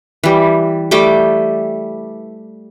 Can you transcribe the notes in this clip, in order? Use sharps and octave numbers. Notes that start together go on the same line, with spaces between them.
E3 G3
G3 A3 G5 D6